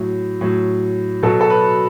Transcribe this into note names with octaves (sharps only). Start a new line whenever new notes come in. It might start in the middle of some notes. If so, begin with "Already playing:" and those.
Already playing: A2 F#3
A2 F#3
B2 F#3 A4
A4
B4